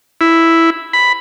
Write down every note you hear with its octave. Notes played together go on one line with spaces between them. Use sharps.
E4
B5